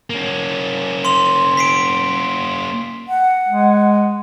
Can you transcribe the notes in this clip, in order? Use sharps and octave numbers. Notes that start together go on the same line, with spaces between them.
A#3 C#4
C6 F7
B6 C7 D7
F#5
G#3